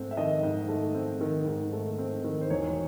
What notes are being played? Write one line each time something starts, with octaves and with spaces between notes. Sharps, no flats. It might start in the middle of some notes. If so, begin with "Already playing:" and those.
Already playing: G#2 A3 C4
E5
D#3 D#5
G#2
A3
C4
D#3
G#2
A3
C4
D#3
C5
E1 C#5